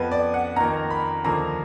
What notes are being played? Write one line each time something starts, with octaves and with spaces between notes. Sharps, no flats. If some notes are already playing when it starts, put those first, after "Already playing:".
Already playing: F2 F3 B3 B4
D5
F#5
F2 D#3 A#3 A#5
B5
D#2 D3 F3 A#3 A#5